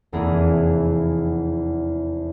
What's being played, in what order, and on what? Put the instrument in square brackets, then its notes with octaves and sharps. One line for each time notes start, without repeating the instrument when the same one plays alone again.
[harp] F1 E2 E3 A#3 G#4